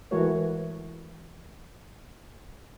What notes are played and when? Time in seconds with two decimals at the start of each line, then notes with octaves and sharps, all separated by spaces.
0.11 E3 G#3 A3 F#4 A#4 C#5